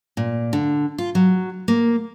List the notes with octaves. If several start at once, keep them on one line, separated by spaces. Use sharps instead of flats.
A#2
D3
F4
F#3
A#3